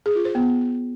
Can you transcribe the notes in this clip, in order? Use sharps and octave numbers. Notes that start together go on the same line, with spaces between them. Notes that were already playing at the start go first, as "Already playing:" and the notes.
G#4
F4
C5
B3